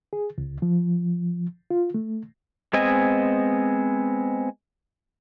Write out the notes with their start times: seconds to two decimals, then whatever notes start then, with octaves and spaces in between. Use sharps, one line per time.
0.13 G#4
0.38 C#2
0.62 F3
1.71 F4
1.94 A3
2.73 G#3 B3 C4 D#5 G#5